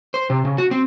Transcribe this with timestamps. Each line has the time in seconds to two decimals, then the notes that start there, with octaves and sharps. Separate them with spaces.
0.14 C5
0.30 C3
0.45 C#3
0.58 F#4
0.71 C4